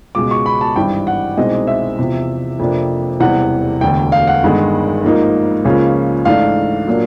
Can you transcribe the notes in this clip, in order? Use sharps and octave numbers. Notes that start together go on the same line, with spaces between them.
C#2 B2 G#3 D6
C#6
B5
A5
G#1 G2 E3 G3 G5
F#5
C2 B2 G#3 C4 D#4 D#5
E5
E2 C3 F3
F2 C3 F3 A#3 D4
E1 E2 C3 E3 G3 F#5
E1 D2 D3 G5
F5
F#5
G1 G2 D#3 G#3
G#2 F3 A#3 D#4
C#2 C#3 F3 A#3 C#4
G#2 E3 A3 D4 F5
A#2 F#3 A#3 D4